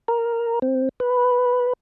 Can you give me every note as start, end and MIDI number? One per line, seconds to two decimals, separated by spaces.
0.08 0.59 70
0.62 0.89 60
1.00 1.73 71